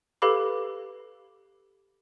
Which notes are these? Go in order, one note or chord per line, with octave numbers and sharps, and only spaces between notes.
G4 A4 B4 F5 B5 D6